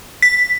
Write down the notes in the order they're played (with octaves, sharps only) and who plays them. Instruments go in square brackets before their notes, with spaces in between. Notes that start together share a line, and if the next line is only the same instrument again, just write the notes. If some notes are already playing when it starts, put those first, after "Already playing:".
[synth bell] B6